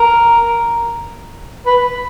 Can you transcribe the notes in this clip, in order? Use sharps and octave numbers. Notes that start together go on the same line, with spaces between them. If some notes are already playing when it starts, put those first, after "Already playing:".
Already playing: A#4
B4